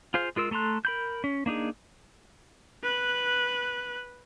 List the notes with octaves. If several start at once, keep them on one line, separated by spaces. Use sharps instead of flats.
F4 G#4 C5 F5
G#3 F4 A#4 E6
A3 A4 A#5 C6 F#6
A#4 B5 G6
C#4
A#3 D4 D#4 G#4
B4 F#6